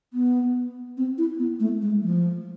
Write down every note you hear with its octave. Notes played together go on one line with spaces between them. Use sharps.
B3
C4
E4
B3
A3
G#3
F3